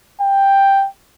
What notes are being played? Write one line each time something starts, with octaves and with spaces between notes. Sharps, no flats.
G5